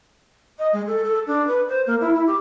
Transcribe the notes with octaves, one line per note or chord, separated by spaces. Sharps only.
D#5
G#3
A4
A4
D4
B4
C5
A#3
E4
E4
G4